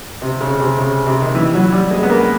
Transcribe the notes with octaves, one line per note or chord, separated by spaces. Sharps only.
C3
C#3
C3
C#3
C3
D#3
E3
F#3
G3
G#3
B3
A#3